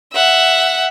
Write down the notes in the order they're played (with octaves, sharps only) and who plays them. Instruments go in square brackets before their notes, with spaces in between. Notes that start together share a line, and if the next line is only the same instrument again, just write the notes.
[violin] E5 F#5